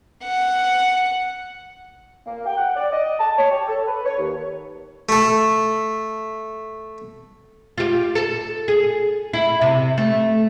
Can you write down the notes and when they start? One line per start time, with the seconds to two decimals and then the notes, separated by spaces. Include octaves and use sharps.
0.24 F#5
2.25 A#3
2.45 G5
2.57 F#5
2.75 D5
2.91 D#5
3.19 A5
3.38 C#5
3.51 G4
3.67 A4
3.86 B4
4.05 C#5
4.18 D#2
5.09 A3 A4
7.78 F4 G4
8.15 A4
8.68 G#4
9.33 E4
9.61 C3
9.98 A3